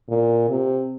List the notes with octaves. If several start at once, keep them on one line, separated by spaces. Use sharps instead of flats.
A#2
C3